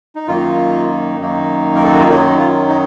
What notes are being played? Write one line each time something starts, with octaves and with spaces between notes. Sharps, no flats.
D#4
F#2 D#3 A#3 D#4 F4
F#2 D#3 A#3 D#4
A#4
A4
F#4
F4
F#2 D#3 F#3 D#4
F4
D#4